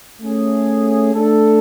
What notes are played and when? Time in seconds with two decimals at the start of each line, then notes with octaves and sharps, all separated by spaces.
0.20 A3 C#4 G#4
1.15 A3 D4 A4